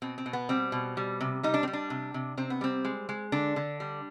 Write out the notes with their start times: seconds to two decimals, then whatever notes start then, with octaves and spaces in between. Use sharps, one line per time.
0.02 B2 C4
0.18 C4
0.26 B2
0.33 B3
0.49 G3 C4
0.72 B2
0.97 G3
1.21 C3
1.43 G3 D#4
1.54 D4
1.63 C4
1.68 G3
1.73 D4
1.90 C3
2.14 C3
2.37 C3 C4
2.50 B3
2.61 G3 C4
2.85 G#3
3.09 G#3
3.32 D3 D4
3.56 D3
3.80 G3